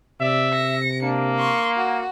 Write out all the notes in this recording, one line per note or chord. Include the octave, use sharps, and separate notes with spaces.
C3 D5 E5
A#6 C#7
A#3 D4
C6 C#6
F#4